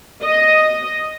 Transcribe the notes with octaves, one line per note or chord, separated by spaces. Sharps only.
D#5